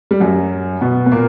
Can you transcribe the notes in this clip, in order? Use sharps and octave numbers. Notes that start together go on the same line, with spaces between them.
G3
F#2 F#3
B2 B3
B3
A#2 A#3